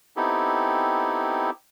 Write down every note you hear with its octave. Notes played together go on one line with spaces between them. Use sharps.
B3 C4 D#4 E4 G4 A4